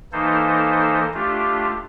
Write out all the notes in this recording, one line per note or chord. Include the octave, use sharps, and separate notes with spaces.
E3 A#3 D#4 A4 C5
A3 D4 F4 G4